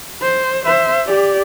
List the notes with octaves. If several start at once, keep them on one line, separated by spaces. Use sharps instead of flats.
C5
C5 E5
G4 D5